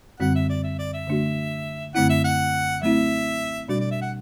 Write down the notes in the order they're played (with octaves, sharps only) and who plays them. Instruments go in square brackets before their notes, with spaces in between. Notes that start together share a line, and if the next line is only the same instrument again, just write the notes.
[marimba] F#2 D3 G3 C4 F#4 [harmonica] F#5
[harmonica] E5
D5
E5
D5
E5
[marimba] D3 A3 D4 F#4
[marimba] F#2 D3 A3 C4 E4 [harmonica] F#5
[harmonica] E5
F#5
[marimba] F#3 A3 C4 E4 [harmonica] E5
[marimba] B2 G3 D4 F#4 [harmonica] D5
[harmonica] D5
E5
F#5